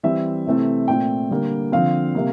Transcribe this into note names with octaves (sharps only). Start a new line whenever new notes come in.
E3 G3 C4 E5
C3 E3 A3 C4
A#2 A3 C4 G5
D3 G3 A#3
D3 F3 C4 F5
C3 G3 A#3